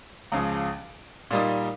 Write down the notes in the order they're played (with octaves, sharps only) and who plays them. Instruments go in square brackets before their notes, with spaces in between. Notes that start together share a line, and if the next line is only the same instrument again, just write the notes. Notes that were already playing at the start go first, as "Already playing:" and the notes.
[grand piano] C#2 C#3 F3
A#2 G3 A#3 D#4